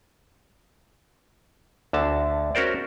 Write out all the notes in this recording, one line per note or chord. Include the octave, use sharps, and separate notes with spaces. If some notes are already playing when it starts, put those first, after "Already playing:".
D2 D3 A5
C#4 F#4 A#4 C5 D5